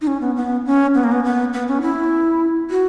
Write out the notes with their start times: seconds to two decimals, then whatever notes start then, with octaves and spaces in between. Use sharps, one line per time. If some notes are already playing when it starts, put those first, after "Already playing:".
0.01 D#4
0.07 C#4
0.21 B3
0.36 B3
0.66 C#4
0.94 B3
1.04 A#3
1.12 B3
1.24 B3
1.53 B3
1.68 C#4
1.82 E4
2.70 F#4